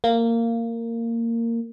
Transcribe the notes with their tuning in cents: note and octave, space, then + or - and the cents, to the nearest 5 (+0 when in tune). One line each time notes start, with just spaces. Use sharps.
A#3 -15